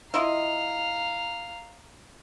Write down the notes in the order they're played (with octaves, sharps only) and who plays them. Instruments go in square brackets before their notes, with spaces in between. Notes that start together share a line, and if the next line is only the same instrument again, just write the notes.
[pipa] E4 F4 D#5 [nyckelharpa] F5 A#5